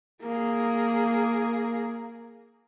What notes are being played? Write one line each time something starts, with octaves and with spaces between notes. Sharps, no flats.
A#3 G#4